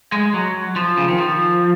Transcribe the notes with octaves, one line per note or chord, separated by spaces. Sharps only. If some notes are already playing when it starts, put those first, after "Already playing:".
G#3
F#3
F3
C#3
D#3
F3